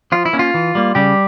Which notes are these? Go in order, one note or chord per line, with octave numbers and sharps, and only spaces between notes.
F3 F4
E4
A#3 C#4
F4
E3
G3 A#3
C#3 G3 G4